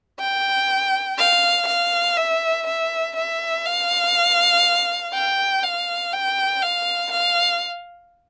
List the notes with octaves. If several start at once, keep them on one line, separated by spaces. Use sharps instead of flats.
G5
F5
F5
E5
E5
E5
F5
G5
F5
G5
F5
F5